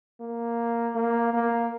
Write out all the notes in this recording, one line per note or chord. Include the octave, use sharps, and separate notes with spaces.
A#3
A#3
A#3